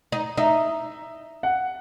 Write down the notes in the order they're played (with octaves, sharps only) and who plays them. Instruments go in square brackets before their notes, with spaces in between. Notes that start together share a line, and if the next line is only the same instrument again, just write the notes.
[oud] D#4
[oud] D#4 [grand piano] E5
[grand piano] F#5